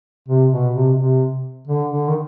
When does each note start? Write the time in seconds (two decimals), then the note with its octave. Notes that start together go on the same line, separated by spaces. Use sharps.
0.29 C3
0.52 B2
0.74 C3
0.98 C3
1.68 D3
1.90 D3
2.08 D#3